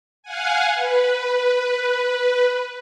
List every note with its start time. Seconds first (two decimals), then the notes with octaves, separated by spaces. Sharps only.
0.23 F5 F#5 G#5
0.75 B4